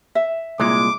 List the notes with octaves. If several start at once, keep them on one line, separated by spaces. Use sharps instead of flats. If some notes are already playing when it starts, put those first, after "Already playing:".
E5
C2 A#2 G#3 D6